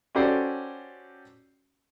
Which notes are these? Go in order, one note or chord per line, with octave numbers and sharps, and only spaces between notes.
C#4 F#4 G4 A4 C5 D5